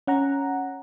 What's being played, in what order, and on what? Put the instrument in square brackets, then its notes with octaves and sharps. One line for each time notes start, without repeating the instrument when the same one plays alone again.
[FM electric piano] C#4 F#5 A#5